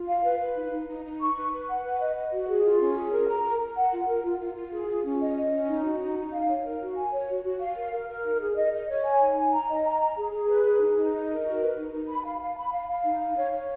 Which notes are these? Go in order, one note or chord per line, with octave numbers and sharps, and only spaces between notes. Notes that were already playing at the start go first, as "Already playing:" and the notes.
Already playing: F4
F5
B4
B4
D#4
D#4
D#4
D#4
C#6
B4
B4
F#5
B4
D#5
D#5
F#4
G#4
F4
C#4
G#4
A#4
A#5
A#4
A#4
F#5
F4
A#4
F4
F4
F4
G#4
F4
C#4
D#5
D#5
C#4
D#4
F#4
D#4
D#4
F5
C#5
A#4
F#4
G#5
C#5
F#4
F#4
F5
A#4
A#4
A#4
D#4
G#4
D#5
D#5
C#5
G#5
D#4
G#5
A#5
D#5
A#5
A#5
G#4
G#4
B4
G#4
D#4
D#4
D#5
A#4
F#4
B4
D#4
D#4
B5
F5
F5
B5
F5
F5
D#4
F5
C#5
C#5